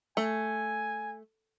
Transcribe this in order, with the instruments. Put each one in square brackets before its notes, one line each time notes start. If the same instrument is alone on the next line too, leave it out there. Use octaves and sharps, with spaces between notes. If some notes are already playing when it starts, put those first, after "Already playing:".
[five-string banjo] A3 [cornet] G#5